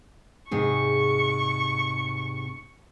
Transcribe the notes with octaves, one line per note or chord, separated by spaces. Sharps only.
G#2 C3 G#4 C#6